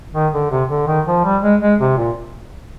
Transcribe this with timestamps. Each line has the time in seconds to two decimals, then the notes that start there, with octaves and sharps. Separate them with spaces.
0.15 D#3
0.33 D3
0.51 C3
0.70 D3
0.87 D#3
1.07 F3
1.24 G3
1.43 G#3
1.62 G#3
1.80 C3
1.98 A#2